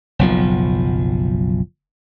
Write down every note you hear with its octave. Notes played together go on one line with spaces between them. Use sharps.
F#1 B1 F3